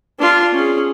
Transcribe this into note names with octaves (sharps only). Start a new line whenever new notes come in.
D4 F4
C#4 G#4